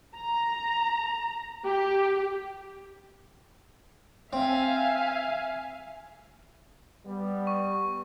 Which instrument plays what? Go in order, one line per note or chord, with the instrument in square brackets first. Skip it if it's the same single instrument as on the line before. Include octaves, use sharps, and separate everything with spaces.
[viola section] A#5
G4
[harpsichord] C4 [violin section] E5 F5 G#5
[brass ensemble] G3 B3
[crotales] C#6